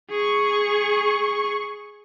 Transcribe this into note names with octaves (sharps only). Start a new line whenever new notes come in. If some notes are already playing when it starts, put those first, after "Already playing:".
G#4 C#6